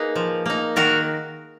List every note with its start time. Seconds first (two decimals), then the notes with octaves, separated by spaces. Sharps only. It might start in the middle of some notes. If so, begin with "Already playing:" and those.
Already playing: A#3 D#4 G#4 B4
0.16 F3
0.46 A#3 D#4
0.76 D#3 F#4 A#4